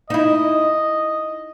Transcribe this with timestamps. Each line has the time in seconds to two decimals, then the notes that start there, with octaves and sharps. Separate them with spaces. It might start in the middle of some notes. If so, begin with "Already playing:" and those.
0.10 D#4 E4 D#5